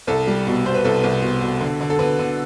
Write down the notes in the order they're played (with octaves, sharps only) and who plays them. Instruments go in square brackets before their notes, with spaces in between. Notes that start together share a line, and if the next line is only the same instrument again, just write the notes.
[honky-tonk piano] C2 A4
G3
B2
B2 C5
B4
C2 A4
C2
B2
B2
D3
D3
A4
D3 B4
D3